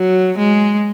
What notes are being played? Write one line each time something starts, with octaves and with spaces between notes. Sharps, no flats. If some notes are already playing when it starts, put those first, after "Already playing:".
Already playing: F#3
G#3